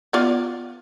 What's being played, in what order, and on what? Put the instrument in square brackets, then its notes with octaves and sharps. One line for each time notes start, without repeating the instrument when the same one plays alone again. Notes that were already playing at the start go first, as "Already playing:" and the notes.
[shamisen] B3 F4 D5